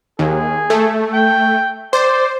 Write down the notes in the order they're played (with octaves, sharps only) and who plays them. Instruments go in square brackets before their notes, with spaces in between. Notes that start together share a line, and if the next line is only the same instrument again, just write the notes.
[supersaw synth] D#2 [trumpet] G#4
[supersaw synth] A3
[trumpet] G5
[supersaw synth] C5 [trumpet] D5